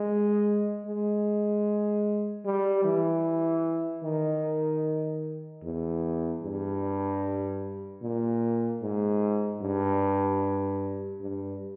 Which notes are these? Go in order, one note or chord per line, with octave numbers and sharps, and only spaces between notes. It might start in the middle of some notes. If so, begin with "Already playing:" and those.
Already playing: G#3
G#3
G3
E3
D#3
E2
G2
A#2
G#2
G2
G2